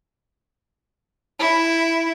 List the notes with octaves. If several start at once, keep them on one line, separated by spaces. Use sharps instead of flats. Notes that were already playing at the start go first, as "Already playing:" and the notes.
E4